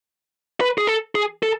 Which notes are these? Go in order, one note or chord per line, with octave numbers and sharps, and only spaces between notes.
B4
G#4
A4
G#4
A4